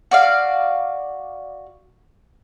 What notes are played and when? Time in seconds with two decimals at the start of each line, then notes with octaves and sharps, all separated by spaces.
0.11 F#4 D5 F5